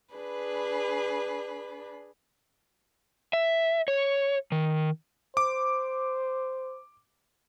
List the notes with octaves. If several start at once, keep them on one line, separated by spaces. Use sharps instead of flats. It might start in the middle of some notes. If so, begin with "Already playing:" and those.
D4 G#4 B4 B5
E5
C#5
D#3
C5 D6